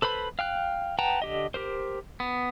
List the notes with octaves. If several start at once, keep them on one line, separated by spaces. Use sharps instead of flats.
A4 B4 C5 B5
F5 G5 F#6
B4 F#5 G5 A5 A#5
D3 G4 D#5
G4 A#4 C5
B3